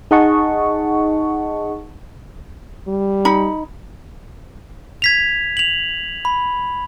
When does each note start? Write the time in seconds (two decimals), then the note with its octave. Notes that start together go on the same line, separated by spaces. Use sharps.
0.11 D#4 G#4 D#5 F#5 A5 C#6
2.88 G3
3.25 D#4 B5
5.02 G#6 B6 F7
5.57 F7 F#7
6.25 B5